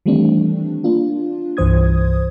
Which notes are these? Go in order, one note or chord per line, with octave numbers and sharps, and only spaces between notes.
D#3 E3 G3 A3 C4 D4
A#3 D4 F4
C2 G2 E3 C5 D#6 G#6